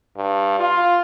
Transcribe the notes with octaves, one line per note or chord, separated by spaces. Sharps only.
G2
F4